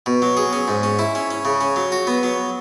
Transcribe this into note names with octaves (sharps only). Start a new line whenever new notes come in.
B2
F#3
G#4
C#4
G#2
C#4
E4
C#4
C#4
C#3
C#4
F#3
F#4
B3
F#3